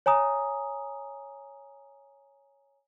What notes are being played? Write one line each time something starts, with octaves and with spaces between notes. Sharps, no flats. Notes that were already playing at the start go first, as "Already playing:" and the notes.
C#5 G#5 A#5 D#6